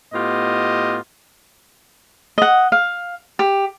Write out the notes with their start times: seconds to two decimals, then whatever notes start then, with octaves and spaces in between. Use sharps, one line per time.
0.13 A2 B3 F4 G4 D#5
2.38 D#5 F#5
2.72 F5
3.39 G4